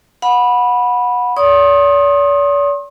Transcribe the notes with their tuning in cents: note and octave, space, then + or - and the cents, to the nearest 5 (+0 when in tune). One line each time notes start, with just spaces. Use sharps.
F#5 -25 B5 -10
D5 -45 C6 +40 D#6 +0